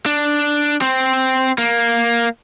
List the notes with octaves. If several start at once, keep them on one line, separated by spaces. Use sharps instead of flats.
D4
C4
A#3